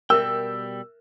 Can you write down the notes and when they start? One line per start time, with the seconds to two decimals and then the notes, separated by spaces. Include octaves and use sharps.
0.10 B2 G3 A#4 E5 G5 E6